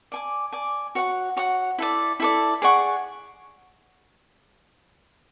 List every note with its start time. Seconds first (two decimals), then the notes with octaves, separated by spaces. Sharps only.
0.12 D5 G#5 D6
0.52 D5 G#5 D6
0.95 F#4 C#5 F#5
1.37 F#4 C#5 F#5
1.78 E4 A4 D5
2.20 E4 A4 D5
2.62 G#4 D5 F#5 C#6